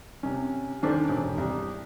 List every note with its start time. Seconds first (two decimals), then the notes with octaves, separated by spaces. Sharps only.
0.23 C3 C#4
0.82 D#3 C#4 D4 A4 C5
1.09 E1
1.38 C2